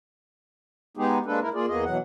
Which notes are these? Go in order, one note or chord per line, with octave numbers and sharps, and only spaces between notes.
G#3 B3 D#4 G4 G#4
G#3 A#3 D4 A4 B4
G#2 E4 A#4
A#3 F4 G#4 D5
E2 A#3 B3 G#4 D#5
B2 E3 F#3 F#5